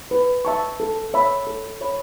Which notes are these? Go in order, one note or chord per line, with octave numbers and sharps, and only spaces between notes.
B4
E5 A5 C#6
A4
C#5 E5 B5
A4
C#5 E5 B5